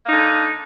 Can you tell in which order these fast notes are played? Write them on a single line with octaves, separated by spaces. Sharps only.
A#3 D#4 D3